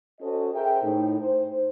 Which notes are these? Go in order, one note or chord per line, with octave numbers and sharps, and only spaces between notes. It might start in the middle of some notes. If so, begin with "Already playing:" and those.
C#4 F#4 A4 C5 D#5
G#4 A#4 C5 E5 G5
A2 A3 D#4
C5